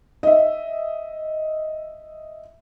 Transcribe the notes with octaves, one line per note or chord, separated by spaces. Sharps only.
D#5 E5